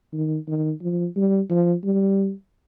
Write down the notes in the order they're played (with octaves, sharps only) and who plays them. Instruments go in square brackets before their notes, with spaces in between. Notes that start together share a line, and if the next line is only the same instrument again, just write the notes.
[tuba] D#3
D#3
F3
G3
F3
G3